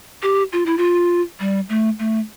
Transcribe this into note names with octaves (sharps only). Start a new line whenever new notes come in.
G4
F4
E4
F4
G3
A3
A3